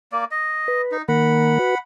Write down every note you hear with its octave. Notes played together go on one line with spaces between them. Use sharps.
A#3 D5
D#5
B4
D#4
D#3 A#3 A#4 F#5 B5
F#4 B4